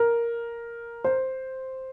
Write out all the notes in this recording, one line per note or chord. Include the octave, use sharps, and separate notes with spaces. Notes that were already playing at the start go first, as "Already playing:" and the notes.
Already playing: A#4
C5